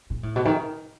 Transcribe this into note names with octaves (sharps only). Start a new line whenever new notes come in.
A#2
A2
B2
D#3